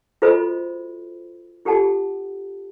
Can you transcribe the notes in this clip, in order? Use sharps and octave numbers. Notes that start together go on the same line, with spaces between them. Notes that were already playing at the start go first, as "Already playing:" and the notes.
F4 F#4 A4 C5 D#5 B5
F4 G4 A4 F#5 A5